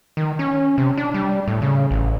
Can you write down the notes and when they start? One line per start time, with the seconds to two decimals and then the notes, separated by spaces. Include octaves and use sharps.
0.17 D#3
0.39 C#4
0.78 C3
0.97 D4
1.14 G3
1.48 A2
1.62 C#3
1.91 A1